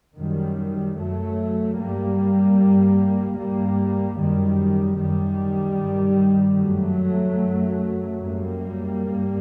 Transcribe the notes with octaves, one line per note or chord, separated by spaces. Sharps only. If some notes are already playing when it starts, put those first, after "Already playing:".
F#2 D#3 G3
F#2 F#3 A3
G2 G3 A#3
G2
G2 G3 A#3
F#2 D#3 G3
F#2 D#3 G3
G2
F#2 F#3 A3
F#2
F#2 G3 A#3
G2